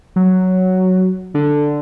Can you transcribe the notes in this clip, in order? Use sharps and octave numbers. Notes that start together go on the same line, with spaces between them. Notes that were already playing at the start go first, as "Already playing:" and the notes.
F#3
D3